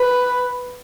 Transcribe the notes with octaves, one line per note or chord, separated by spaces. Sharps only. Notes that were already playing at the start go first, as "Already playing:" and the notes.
Already playing: B4